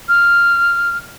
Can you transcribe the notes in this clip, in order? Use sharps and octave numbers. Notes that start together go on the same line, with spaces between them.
F6